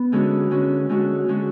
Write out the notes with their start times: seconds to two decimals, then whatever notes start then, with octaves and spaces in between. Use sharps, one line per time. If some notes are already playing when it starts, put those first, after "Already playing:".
Already playing: B3
0.12 D3 G#3 C#4 F#4
0.50 D3 G#3 C#4 F#4
0.89 D3 G#3 C#4 F#4
1.28 D3 G#3 C#4 F#4